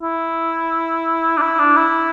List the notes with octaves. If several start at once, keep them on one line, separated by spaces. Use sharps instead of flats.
E4
D4
E4
D4
E4